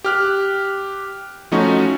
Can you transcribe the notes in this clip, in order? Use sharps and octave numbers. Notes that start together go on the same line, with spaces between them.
G4 F6 F#6
F3 A3 C#4 D#4 F#4